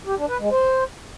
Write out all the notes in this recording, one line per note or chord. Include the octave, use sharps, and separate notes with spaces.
G4
D4
B4
G#3
C5